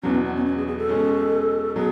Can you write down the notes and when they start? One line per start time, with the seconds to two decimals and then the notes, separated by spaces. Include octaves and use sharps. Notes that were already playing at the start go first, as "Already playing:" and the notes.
0.03 E2 B2 F#3 C#4
0.14 B3
0.25 B3
0.35 C#4
0.46 C#4
0.57 G#4
0.67 G#4
0.78 A4
0.89 B2 G#3 C#4
1.75 B2 F#3 G#4